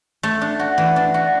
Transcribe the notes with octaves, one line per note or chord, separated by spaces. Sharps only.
A3
D4
F#4
E3
D4
F#4